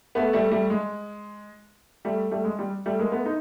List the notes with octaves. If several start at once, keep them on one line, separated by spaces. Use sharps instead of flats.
A3 B3
G3 A3
G3 A3
G#3
G3 A3
G3 A3
G#3
G3
G3 A3
G#3 A#3
A3 B3
D#4